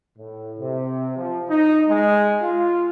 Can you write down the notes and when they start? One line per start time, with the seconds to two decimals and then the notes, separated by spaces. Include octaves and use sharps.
0.19 A2
0.59 C3
1.17 F3
1.49 D#4
1.89 G#3
2.41 F4